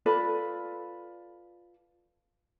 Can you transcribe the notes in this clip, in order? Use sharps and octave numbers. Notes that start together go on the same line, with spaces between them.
F4 A4 B4 D5